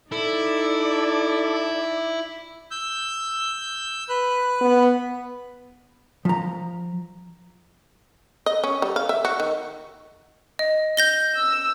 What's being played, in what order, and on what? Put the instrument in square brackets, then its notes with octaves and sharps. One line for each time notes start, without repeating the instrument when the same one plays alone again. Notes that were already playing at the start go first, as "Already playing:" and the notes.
[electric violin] D#4 D5 [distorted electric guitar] E4 [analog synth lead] A4
[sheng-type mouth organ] E6 G6
B4 F#6
[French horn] B3
[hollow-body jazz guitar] F3 A#5
[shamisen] D#5
C#4
G3
F5
E5
F#4
D#3
[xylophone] D#5
G6 A#6 G7
[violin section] E6